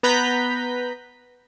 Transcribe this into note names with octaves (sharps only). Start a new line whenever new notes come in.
B3 B4 A#5 B5 G6 B6